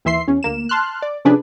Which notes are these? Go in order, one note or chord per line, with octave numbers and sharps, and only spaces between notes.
D#2 E3 E5 C6 C7
E2 C#4
D2 A#3 E7
A5 C6 F6 F#6
D5
C3 F3 C#4 D4 G#4 B4